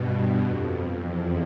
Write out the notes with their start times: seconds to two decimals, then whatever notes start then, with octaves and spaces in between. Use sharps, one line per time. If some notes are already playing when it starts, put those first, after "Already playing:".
Already playing: G2 B2
0.41 F2
1.02 E2